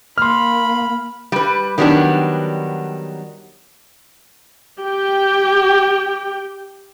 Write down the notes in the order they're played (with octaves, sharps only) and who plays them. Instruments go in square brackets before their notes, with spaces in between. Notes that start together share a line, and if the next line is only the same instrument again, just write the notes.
[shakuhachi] A#3 [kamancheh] B5 [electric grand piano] C6 F6
[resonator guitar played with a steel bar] G3 B4
D#3 F#3 G3 B3 D4
[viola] G4 G5